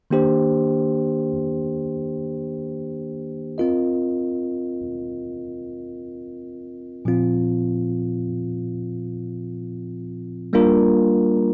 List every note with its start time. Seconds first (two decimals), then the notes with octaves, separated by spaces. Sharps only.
0.10 D#3 A#3 D4 G4 C5
3.58 C4 F4 A#4 D#5
7.05 A#2 F3 C4 F4
10.53 G3 A#3 D4 F4 A#4